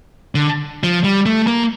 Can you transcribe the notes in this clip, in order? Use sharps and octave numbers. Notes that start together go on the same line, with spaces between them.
D3
F3
G3
A3
A#3